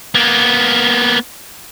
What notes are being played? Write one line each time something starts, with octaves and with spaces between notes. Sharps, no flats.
A#3 B3